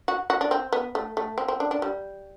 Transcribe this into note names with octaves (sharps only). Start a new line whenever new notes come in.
F#4
F#4
D4
C4
B3
A3
A3
C4
C4
D4
D4
G3